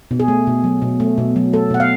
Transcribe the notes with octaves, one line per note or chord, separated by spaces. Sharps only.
B2
G#4
A3
B2
F#3
B2
A3
B2
F#3
A3 A4
B2 F#5
F5